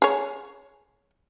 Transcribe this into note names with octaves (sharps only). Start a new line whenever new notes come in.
G#4 C#5